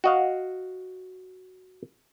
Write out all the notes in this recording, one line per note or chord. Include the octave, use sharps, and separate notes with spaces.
F#4 D#5 F5